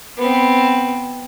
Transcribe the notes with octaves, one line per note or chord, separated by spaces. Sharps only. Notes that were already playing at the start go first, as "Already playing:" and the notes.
B3 C4